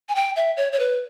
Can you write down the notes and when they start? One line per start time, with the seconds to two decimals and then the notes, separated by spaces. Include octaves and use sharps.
0.09 G#5
0.15 G5
0.36 E5
0.57 C#5
0.72 C#5
0.79 B4